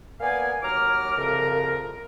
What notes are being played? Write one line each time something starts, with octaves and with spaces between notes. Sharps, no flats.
A#3 B3 D5 F5 G#5
D#2 F#3 A#5 D6 F6
C2 F2 C#3 A#4